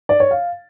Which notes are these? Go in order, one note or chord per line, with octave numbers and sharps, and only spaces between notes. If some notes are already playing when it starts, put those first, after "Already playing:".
D5
C#5
F5